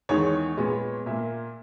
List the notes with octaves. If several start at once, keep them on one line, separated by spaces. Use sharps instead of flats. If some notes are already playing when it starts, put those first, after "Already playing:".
E2 D#3 G#3 C#5
A#2 G#3 B3
A#2 A#3 E5